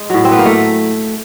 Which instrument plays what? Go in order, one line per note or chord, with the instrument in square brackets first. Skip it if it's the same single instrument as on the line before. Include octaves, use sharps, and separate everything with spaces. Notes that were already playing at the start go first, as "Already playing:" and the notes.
Already playing: [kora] G#3
A2 F#3
C4
B3
A#3
A3